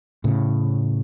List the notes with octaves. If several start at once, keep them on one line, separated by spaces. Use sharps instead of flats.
A2 C#3